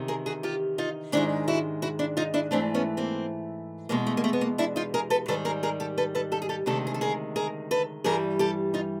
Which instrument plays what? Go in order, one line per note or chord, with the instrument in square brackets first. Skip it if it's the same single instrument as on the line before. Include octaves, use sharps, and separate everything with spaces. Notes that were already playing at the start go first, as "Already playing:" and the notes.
Already playing: [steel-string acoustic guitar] E2 C3 D#3
G#4 A#4
F#4 G#4
F4 G4
D#4 F4
G#2 D#3 G#3 D4 E4
E4 F#4
E4 F#4
D4 E4
D#4 F4
D4 E4
G#2 E3 A3 C4 D4
B3 C#4
A#3 C4
E2 B2 G#3 A#3
A3
A#3
A3
B3
A#3
D4 E4
D#4 F4
G#4 A#4
A4 B4
G#2 D#3 G3 A4 B4
G#4 A#4
G#4 A#4
G4 A4
A4 B4
A4 B4
G4 A4
G#4
G4 A4
D2 C3 D#3 G#3 G4 A4
G#4
A4
G#4 A#4
G#4 A#4
A4 B4
G2 E3 G3 G#4 A#4
G4 A4
D#4 F4